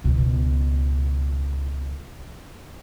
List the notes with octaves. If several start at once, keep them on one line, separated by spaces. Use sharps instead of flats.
C#2 B2